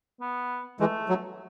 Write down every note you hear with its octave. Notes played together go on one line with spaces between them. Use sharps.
B3
E3 G#3 A3
F#3